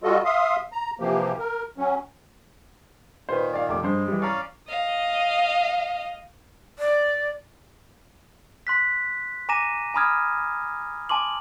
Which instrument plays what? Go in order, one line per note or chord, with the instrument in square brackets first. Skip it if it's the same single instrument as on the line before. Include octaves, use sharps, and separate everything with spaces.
[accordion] G3 F4 F#4 A4 D#5
E5 F5 C6 D#6
A#5
C3 E3 F3 A#3 G4
A#4
F#3 C#4
[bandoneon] A#2 D#3 [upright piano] B4 C5
[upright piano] D5 F5
F1 D6
[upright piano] G2 C5 [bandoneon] G#3
[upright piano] E3 G3
[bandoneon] C#4 D5 F5 [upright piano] A#5 C#6
[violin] D#5 F5
[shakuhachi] D5
[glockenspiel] C6 F#6 B6
G#5 A#5 D6 A#6 D#7 E7
G#5 A#5 B5 D#6 F6 G#6
G#5 A5 C6 D6 F#7